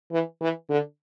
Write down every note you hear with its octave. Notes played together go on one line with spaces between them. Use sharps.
E3
E3
D3